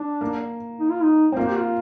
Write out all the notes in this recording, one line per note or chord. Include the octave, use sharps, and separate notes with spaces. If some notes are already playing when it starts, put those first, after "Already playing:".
Already playing: D4
A#3
D#4
F4
D#4
C4
A#3 F4
G4
F4